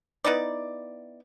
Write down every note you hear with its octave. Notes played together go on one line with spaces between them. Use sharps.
B3 D#4 E4 D5